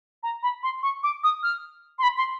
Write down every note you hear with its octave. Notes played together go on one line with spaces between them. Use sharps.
A#5
B5
C6
C#6
D6
D#6
F6
C6
B5
C6